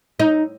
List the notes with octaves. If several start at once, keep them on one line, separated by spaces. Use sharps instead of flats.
D#4